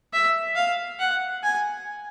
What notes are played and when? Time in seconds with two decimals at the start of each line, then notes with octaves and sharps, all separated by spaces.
0.13 E5
0.56 F5
0.99 F#5
1.43 G#5